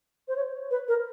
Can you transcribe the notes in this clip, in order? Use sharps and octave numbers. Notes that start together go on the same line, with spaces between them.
C5
C#5
B4
A#4